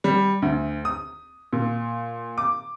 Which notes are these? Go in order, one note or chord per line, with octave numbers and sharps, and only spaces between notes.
G3
D2
D#6
A#2
D6